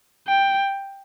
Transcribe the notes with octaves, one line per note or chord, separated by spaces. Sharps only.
G5